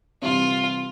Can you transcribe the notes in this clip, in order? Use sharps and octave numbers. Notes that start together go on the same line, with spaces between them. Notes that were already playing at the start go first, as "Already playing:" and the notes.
C3 E3 G3 C4 F4